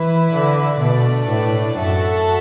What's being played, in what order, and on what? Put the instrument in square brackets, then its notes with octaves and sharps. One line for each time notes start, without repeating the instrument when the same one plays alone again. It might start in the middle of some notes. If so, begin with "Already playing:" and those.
Already playing: [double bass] E3 [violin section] E4 B4 E5
[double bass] D3
[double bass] B2 [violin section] A3 D4 B4 D5
[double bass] A2
[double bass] F#2 [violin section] F#4 A4 E5 A5